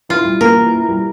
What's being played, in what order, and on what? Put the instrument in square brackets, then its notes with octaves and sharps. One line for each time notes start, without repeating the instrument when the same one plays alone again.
[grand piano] E4 [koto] F4
[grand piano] G3
[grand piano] A#3 [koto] A#4
[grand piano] E3
E4
G3